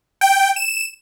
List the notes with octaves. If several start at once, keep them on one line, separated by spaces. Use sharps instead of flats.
G5
E7